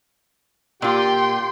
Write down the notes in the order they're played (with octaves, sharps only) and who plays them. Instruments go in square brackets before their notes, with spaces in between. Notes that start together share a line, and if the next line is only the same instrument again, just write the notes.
[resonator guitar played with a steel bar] A#2 F4 [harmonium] G4 [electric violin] G5 C6